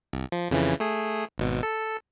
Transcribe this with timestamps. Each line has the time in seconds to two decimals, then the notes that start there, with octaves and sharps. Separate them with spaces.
0.13 C2
0.32 F3
0.51 F2 C#3 E3
0.80 A3 G#4
1.38 G#1 B2
1.63 A4